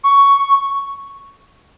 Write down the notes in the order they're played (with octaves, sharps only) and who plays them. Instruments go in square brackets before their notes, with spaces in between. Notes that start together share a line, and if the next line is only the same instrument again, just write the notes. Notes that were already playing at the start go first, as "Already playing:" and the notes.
[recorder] C#6